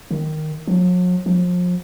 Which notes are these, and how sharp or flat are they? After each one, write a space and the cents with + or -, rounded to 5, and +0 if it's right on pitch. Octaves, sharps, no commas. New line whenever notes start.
D#3 -5
F#3 -45
F3 +35